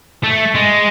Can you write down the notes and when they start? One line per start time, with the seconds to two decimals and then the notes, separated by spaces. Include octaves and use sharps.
0.24 A3
0.55 G#3